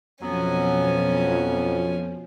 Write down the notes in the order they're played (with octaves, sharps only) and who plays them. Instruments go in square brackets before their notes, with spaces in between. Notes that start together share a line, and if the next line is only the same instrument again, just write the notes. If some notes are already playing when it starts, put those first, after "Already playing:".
[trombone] F2 [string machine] B2 F3 [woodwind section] F#3 B3 [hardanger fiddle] C#4 G#5